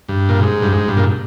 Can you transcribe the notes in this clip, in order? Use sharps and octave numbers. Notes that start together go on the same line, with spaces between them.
G2
A#2
G#2
G2
G#2
G2
A#2